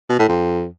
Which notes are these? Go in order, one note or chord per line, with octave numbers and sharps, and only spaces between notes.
B2
A2
F2